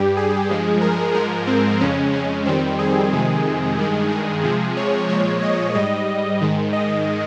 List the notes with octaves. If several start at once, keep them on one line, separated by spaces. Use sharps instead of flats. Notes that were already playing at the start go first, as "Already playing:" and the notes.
Already playing: G2 G3 G4
G#4
G2 F3 G#3
A#4
G#2 F3 G#3 A#4
C4
F2 C#3 G#3 C#4
C#4
F2 D#3 G3 C4
G#4
F2 C3 D#3 G#3
G2 D#3 G#3
G#4
C3 F3 G#3
C#5
A#2 F3 G#3 C#5
D#5
G#2 G3 D#5
G#2 D#3 G#3
D#5